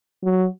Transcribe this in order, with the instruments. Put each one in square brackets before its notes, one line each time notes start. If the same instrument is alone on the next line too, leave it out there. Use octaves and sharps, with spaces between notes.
[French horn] F#3